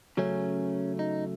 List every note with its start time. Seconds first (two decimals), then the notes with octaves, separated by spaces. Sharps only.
0.17 C#3 F#3 A3 C#4
0.99 D#4